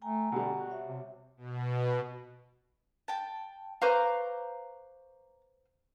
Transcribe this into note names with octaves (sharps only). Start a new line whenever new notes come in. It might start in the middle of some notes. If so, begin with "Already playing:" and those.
A3 G5 G#5 A#5
B2 D3 G3
F#4
C#5 E5
C3
B2
G5 A5
B4 C5 F5 A#5 C#6 D6